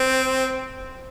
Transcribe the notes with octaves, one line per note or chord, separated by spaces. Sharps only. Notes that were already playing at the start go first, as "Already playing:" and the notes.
Already playing: C4